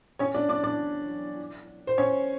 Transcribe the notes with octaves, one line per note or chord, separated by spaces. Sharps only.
C#4 C#5
D4 D5
D4 D5
D4 D5
C5
C#4 C#5